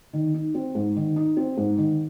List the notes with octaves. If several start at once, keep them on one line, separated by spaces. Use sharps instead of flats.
D#3
D#4
C4
G#2
D#3
D#4
C4
G#2
D#3